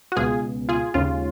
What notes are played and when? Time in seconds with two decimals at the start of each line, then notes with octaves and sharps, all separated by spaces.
0.12 F#4
0.16 C#2 B2 G#3 F4 G#4
0.69 F4 G#4
0.94 D#2 C#3 G#3 C#4 F4